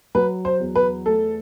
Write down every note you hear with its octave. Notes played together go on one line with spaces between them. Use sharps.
F#3 B4
C5
E2
B4
A3 A4